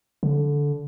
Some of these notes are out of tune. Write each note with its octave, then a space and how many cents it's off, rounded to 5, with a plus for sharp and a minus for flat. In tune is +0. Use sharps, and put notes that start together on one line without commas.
D3 -15